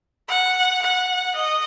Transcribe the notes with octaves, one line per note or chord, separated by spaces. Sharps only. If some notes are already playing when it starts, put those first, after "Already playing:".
F#5
F#5
D#5